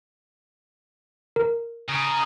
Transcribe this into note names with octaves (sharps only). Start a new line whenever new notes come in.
A#4
C#3 A#5 D#6